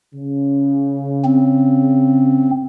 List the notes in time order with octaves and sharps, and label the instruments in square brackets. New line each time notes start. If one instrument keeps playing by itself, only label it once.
[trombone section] C#3
[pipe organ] C4